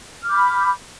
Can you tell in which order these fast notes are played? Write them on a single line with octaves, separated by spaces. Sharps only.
F6 D6 G6 B5